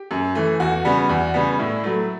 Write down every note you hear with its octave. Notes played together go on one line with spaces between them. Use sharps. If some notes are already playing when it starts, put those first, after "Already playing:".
Already playing: G4
F#2
E3 A3
E2 F#4
C#3 G3 B3
E2
C#3 G3 B3
A2 E4
F#3 A3